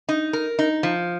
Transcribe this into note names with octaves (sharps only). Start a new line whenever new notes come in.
D#4
A#4
D#4
F3